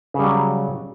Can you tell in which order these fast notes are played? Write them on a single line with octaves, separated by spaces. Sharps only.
C#3 G3 F#3